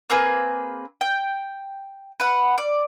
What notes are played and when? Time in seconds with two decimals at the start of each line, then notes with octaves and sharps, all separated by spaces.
0.10 A#3 C4 G#4 B4
1.01 G5
2.20 B4 F#5
2.58 D5